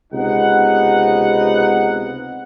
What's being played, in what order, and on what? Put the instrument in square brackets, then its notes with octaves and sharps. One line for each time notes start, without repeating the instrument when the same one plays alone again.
[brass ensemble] C#2 C3 B3 D#4 F#5